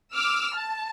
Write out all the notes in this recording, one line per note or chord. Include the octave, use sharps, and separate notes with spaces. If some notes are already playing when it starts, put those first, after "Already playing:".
D6 E6 F6
A5